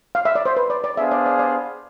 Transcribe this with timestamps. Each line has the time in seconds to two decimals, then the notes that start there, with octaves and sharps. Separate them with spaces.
0.15 F5
0.25 E5
0.35 D5
0.46 C5
0.57 B4
0.70 D5
0.84 D5
0.97 B3 D4 G#4 C5 E5 F5
1.11 D5
1.26 D5
1.39 D5